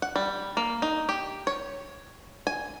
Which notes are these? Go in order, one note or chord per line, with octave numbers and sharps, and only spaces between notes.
F#5
G3
A#3
D#4
G4
C#5
G#5